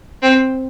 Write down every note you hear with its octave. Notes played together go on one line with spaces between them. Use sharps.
C4